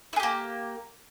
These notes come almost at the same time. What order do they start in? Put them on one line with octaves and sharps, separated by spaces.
E4 G#4 G4 A#3